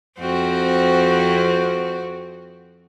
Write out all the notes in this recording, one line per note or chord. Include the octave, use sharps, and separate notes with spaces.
F2 C4 F#4